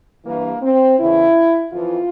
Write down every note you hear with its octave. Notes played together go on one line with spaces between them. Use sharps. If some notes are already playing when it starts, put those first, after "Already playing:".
G2 E3 A#3
C4
E2 C#3 E3 E4
F2 E3 F4